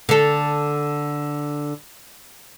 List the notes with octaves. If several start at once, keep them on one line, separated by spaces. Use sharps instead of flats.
D3 A4